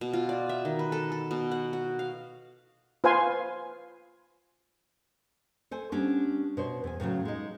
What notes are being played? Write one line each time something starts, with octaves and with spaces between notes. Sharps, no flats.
B2
F4
D5
E5
D#3
B4
A4
A4
B2
F#5
F#4
F5
F4 B4 C5 F5 G#5 C6
A4 C5 G#5
G3 B3 C#4 D4
B2 C5 C#5
E2 G#5
A2 C#3 F3 F#3
G#3 D#4